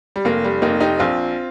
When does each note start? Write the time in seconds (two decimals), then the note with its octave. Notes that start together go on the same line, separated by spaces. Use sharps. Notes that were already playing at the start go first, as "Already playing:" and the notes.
0.16 G3
0.25 F1 A#3
0.44 G3
0.62 F1 A#3 D#4
0.80 D#4 G4
0.99 A#1 C4 F4